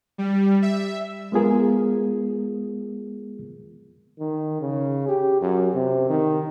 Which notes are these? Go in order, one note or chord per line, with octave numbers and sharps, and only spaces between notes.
G3
E5
G#3 B3 F4 G#4 A#4
D#3
C#3
G4
F#2
C3
D#3